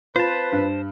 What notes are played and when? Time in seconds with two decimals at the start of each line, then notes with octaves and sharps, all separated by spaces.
0.16 C4 F4 B4 C5 A5
0.52 G2